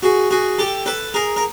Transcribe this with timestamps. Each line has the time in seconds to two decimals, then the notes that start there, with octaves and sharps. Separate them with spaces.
0.03 F#4 G#4
0.31 F#4 G#4
0.58 G4 A4
0.86 A4 B4
1.14 G#4 A#4
1.36 A#4